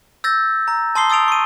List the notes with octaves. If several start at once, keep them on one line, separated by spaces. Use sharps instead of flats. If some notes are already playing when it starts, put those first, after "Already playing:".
E6 G6 A6 A#6
A#5
A5 C6 D#6 C7 G7
D#6 E6 A6 D7 F7
C#6 D#7